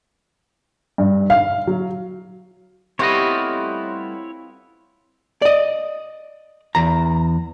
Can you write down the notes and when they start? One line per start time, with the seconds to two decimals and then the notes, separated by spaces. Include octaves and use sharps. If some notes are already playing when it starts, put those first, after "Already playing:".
0.98 G2
1.30 F5
1.67 F#3
2.99 G3 A3 B3 C4 E4 F4 C#5 D#5
5.42 D5 D#5
6.75 E2 A#5